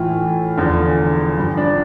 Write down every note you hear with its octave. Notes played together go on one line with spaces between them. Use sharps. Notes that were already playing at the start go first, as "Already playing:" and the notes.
Already playing: A2 E3 F4
E2 D3 F3
G2 F3
D4 D5